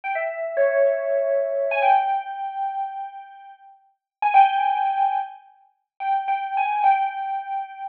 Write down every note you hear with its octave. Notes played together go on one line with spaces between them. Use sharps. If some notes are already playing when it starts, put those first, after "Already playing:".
G5
E5
C#5
G#5
G5
G#5
G5
G5
G5
G#5
G5